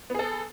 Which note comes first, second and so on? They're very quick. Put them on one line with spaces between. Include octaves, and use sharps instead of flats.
B3 G#4 A4